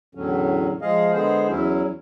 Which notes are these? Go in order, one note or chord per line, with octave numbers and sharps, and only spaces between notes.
E2 A2 D3 F#3 C#4
F3 G#3 G#4 D#5 F5
D3 G#3 B3 G#4 C5
E2 F#3 C#4 E4